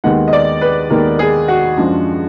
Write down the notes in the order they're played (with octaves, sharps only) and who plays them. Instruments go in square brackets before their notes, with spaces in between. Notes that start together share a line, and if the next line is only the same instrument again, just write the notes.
[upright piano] D#2 D#3 G#3 B3 F#5
D#5
D5
B4
D#2 D#3 G#3 B3 A#4
G#4
F#4
F#2 F3 G#3 D4